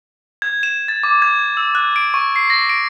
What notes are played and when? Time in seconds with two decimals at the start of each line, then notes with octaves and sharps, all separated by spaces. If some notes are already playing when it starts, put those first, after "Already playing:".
0.42 G#6
0.63 E7
0.88 A6
1.03 D6
1.22 G#6
1.57 E6
1.75 F#6
1.96 D7
2.14 C#6
2.36 C7
2.50 A#6
2.69 D7